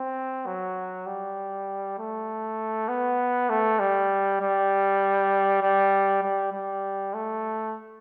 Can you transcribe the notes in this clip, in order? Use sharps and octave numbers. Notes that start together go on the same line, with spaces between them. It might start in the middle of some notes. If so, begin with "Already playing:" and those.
Already playing: C4
F#3
G3
A3
B3
A3
G3
G3
G3
G3
G3
A3